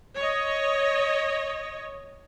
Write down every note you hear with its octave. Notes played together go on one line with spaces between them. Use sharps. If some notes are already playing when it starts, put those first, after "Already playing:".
C#5 D#5